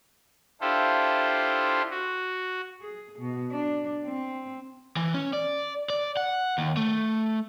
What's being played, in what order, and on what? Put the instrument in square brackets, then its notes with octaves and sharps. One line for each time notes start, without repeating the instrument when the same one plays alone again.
[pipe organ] D4 E4 F4 G4 A4 C5
F#4
[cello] G#4
B2
D4
C4
[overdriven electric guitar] E3
C#4
D5
D5
F#5
D#2
A3